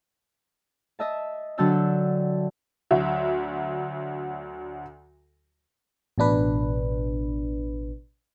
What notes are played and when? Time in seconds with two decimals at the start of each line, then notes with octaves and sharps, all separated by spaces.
0.99 D#5 E5 A5
1.58 D3 F#3 D4 G5 A5 E6
2.91 D2 F#3 E5
6.18 A1 B2 D4 B4